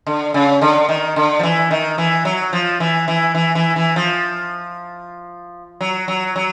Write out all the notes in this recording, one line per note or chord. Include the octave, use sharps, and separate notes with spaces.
D3
C#3
D3
D#3
D3
F3
E3
D#3
E3
F#3
F3
E3
E3
E3
E3
E3
F3
F#3
F#3
F#3